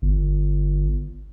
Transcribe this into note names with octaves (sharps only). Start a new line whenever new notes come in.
G1